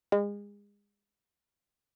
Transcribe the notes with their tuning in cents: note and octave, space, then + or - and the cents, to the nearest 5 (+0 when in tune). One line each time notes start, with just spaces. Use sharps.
G#3 -30